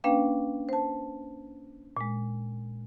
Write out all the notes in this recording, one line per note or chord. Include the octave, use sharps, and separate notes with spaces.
A#3 C#4 D4 B4 F5 G5
C5 A5
A#2 G#3